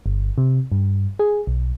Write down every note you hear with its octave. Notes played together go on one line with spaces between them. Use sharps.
G1
C3
G2
G#4
B1